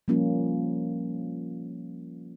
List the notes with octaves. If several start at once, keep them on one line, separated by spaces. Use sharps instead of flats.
F3 G3 A#3 C#4 F4